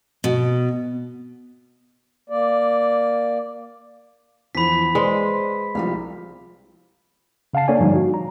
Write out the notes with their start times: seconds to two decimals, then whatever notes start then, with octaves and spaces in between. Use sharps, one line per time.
0.24 B2
2.30 A#3 D5
4.55 E2 E3 F3 B5 B6
4.95 G#3 B4 C5 D5 C6
5.75 C2 F3 G4 F5
7.53 C#3 F5 F#5 A5 C7
7.68 A#3 D4 A4 C#5 D5 G#5
7.79 G2 D3 F3 G3 D#4
7.95 F#4
8.14 A#5